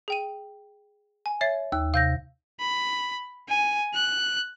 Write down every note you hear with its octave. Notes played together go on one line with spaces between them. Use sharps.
G#4 G5 D#7
G#5
C#5 E5 A6 C7
D#2 E6
C3 F5 G6 A#6
B5
G#5
F#6